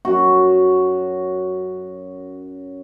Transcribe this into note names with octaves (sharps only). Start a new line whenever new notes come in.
F#2 F#4